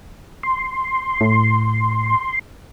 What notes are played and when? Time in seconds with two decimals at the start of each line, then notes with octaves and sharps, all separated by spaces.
0.43 C6
1.21 A2